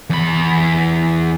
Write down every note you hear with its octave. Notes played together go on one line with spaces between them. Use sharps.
E2 B5